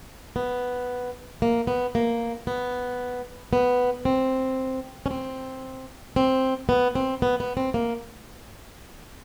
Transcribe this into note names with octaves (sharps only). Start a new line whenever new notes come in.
B3
A#3
B3
A#3
B3
B3
C4
C#4
C4
C4
B3
C4
B3
B3
C4
A#3